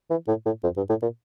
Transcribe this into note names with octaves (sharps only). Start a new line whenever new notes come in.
E3
A2
A2
F2
G2
A2
A#2